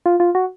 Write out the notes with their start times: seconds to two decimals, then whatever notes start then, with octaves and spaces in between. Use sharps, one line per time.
0.06 F4
0.20 F4
0.35 F#4